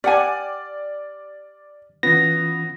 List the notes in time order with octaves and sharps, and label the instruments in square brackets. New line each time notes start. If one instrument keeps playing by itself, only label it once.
[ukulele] G4 F#5 G#5 [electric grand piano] D5 [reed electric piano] F6
[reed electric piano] E3 C#4 F4 [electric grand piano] B3 [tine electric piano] A#6